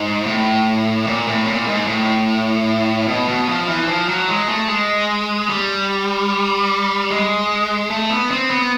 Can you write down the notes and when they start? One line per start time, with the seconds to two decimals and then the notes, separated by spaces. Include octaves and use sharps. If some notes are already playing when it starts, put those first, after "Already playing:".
Already playing: G#2
0.26 A2
1.07 A#2
1.27 A2
1.47 A#2
1.68 G#2
1.87 A2
3.08 B2
3.28 B2
3.48 F3
3.69 E3
3.88 F3
4.09 F#3
4.28 G#3
4.49 A3
4.69 G#3
5.49 G3
7.10 G#3
7.90 A3
8.10 B3
8.31 C4
8.50 B3